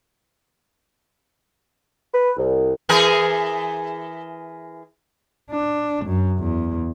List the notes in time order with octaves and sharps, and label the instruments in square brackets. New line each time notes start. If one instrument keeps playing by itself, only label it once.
[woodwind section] B4
C2
[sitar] E3 G#4 A#4
[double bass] D4
F#2
E2